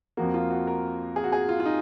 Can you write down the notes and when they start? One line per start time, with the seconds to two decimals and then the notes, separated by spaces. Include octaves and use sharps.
0.17 F2 F3 A#3 F#4
0.34 F4
0.50 F#4
0.67 A#4
1.16 G#4
1.24 F#4
1.32 G#4
1.49 F4
1.60 F4
1.65 D#4